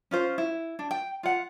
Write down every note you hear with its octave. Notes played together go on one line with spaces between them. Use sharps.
C#4 F4 C5
E4
D4
G5
F4 F#5